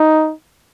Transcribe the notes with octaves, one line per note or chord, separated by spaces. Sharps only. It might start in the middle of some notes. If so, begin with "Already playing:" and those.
Already playing: D#4